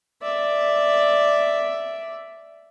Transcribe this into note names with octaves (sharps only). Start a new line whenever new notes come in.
D5 E5